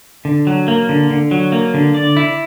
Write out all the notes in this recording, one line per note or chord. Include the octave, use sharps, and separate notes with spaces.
D3
F#3
A#3
D3
D3
F#3
A#3
D3
D5
E4